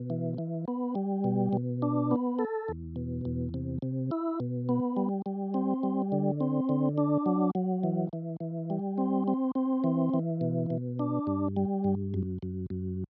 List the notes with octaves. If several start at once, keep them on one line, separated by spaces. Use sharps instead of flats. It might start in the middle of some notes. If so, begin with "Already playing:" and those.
Already playing: B2
E3
E3
B3
G3
B2
B2
D4
B3
A4
E2
B2
E2
C3
C3
E4
B2
B3
G3
G3
C4
G3
D3
C4
D3
D4
F#3
F#3
E3
E3
E3
G3
C4
C4
C4
E3
E3
B2
B2
D4
G2
G3
G2
F#2
F#2
F#2